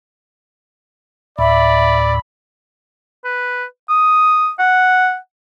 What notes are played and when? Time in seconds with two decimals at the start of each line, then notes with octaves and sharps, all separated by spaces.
1.39 D2 A2 D5 E5 B5
3.25 B4
3.89 D#6
4.59 F#5